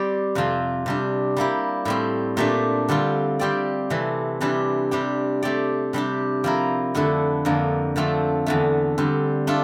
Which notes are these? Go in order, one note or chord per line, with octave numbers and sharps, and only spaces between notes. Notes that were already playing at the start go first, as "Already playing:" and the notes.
Already playing: G3 C4 G4 D5
F2 C3 F3 C4
C3 G3 D4
G3 A#3 E4 G4
A2 G3 C4
A#2 A3 D4 G4
D3 G3 C4 F4
G3 C4 G4 D5
C3 E3 A3
C3 E3 G3 D4 G4
C3 G3 D4 G4
A3 C4 G4 D5
C3 G3 D4 G4
F3 C4 E4 A#4
F2 D3 A3 E4
F2 D3 F3 A#3
D3 F3 A3 C4
E2 D3 A3
D3 G3 C4
A3 D4 F4 A4